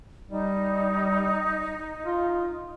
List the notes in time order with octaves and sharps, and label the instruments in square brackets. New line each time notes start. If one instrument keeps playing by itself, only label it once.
[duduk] G3 [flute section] D#4
[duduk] F4